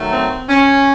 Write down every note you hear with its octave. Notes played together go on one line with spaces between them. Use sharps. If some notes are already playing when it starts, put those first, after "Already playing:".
Already playing: D#3 F#3 A3
C4
C#4